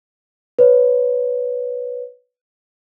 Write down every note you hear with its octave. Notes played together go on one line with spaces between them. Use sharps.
B4 C#5